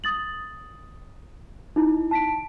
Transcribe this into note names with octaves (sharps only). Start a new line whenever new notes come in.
D#6 A6 F#7
D#4 E4
A5 B6 D7